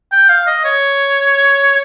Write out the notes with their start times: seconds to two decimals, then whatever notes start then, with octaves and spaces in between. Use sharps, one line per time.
0.12 G5
0.29 F5
0.47 D#5
0.65 C#5